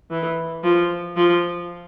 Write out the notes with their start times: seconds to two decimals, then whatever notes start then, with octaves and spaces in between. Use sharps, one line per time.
0.11 E3
0.63 F3
1.16 F3